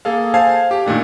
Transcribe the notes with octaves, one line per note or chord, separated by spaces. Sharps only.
A#3 G#4 A4 F5
C5 F5 G#5 A5 G#6 C7
G4
A#2 D#3 A3 D4